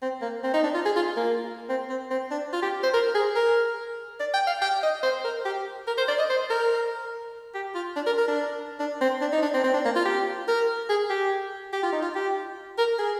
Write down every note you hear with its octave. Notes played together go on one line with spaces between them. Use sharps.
C4
A#3
C4
D#4
D4
F4
G#4
F4
A#3
C4
C4
C4
D4
F4
G4
C5
A#4
G#4
A#4
D5
G5
F5
G5
D#5
C5
A#4
G4
A#4
C5
D5
D#5
C5
A#4
G4
F4
D4
A#4
A#4
D4
D4
C4
D4
D#4
D4
C4
C4
D4
A#3
F4
G4
A#4
G#4
G4
G4
F4
D#4
F4
G4
A#4
G#4